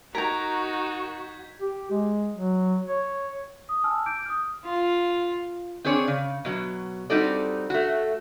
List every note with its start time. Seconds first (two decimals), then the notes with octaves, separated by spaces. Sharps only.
0.15 D#4 F#4 A#4 A#5 G6 G#6 B6
1.60 G4
1.91 G#3
2.34 F#3
2.87 C#5
3.69 D#6
3.84 G#5 A5 E6 F6
4.06 D6 G6 D7
4.25 D#6 F6
4.65 F4
5.85 C4 D4 G#4 C#5 D5
6.08 C#3
6.45 B2 F#3
7.10 G3 C4 D#4 F#4 A4 D5
7.70 A3 F#4